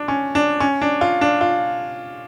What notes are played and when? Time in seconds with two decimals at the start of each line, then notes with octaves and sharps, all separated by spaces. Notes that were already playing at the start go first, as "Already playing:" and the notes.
Already playing: D4
0.08 C#4
0.35 D4
0.60 C#4
0.82 D4
1.01 F4
1.21 D4
1.41 F4